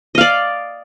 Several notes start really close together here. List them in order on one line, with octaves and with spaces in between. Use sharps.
D#5 F5 D5